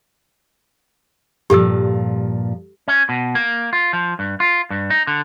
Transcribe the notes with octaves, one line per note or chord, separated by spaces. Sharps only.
G2 A#2 F3 G4 A4 E6
C#4
B2
A#3
F4
F3
G2
F4
G2
D#4
D3